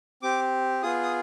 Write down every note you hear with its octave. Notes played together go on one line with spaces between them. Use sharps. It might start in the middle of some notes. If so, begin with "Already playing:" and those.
C4 G4 D6
B3 F4 G#4 D#6
D#6